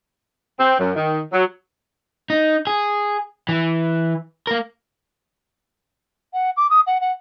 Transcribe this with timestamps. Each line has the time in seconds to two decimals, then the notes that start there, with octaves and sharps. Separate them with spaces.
0.59 C4
0.79 F#2
0.95 D#3
1.32 F#3
2.30 D#4
2.67 G#4
3.49 E3
4.47 A#3 A#4
6.33 F#5
6.57 D6
6.70 D#6
6.87 F#5
7.01 F#5